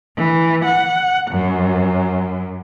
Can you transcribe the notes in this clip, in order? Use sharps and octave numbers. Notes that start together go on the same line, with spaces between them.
E3
F#5
F#2